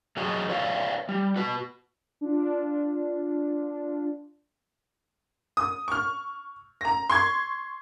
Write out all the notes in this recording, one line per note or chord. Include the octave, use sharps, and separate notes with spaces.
F#3 F#4 G#4 C#5 D#5 F#5
B4 C#5 D5 E5 F5
G3
F#4 B4
D4 F4
D#6
C#6 F6
A#5 A#6
C6 C#6 G#6